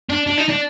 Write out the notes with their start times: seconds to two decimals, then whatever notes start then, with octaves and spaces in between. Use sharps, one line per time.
0.09 D4
0.27 D4
0.37 D#4
0.49 D4